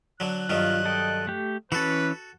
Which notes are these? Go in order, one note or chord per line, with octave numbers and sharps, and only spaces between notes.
D3 F#3 F#6
G2 D#3 F#3 F4
A4 D#5 G5
A3 G4
E3 C#4 F#4 A4 B4